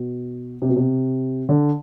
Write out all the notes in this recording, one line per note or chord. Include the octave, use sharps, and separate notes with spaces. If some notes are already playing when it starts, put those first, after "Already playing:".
Already playing: B2
C3
B2
C3
D3